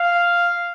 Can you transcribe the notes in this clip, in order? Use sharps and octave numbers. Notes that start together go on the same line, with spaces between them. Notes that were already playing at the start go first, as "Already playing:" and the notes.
Already playing: F5